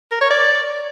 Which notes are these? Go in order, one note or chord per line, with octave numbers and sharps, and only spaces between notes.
A#4
C#5
D5